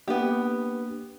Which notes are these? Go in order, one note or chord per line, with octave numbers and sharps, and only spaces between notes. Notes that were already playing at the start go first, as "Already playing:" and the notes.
A#3 B3 D4 G4